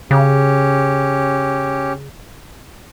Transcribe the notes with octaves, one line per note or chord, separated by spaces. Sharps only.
C#3 C#4 G4